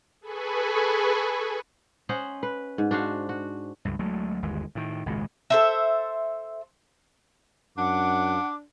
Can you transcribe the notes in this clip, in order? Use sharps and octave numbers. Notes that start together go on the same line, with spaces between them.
G#4 A4 B4 G#5 B5 C#6
C#4 C5 D#5 F#5
B4
G#2
D4 F#4 C5 F5
F#4
C#2 G2
D2 F#3 G#3 A3
G1 D#2 G#3
A2 D#3
G#1 C#2 A#2 G#3
A4 C5 E5
F#2 D4 F#5 D6